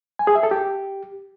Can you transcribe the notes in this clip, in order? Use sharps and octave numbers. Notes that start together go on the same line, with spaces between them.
G#5
G#4
E5
A4
G4